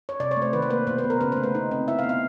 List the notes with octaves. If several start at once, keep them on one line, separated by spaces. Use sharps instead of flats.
C#5
C3 D5
C#5
A3
C5
D#3 B4
C5
A#3 B4
B2 C5
B4
B3
A#4
C#3 B4
A3 C5
B4
D#4
C4
E4 E5
F5
B3
F5